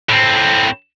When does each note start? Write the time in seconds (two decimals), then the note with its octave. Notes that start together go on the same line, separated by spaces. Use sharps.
0.09 A2 C4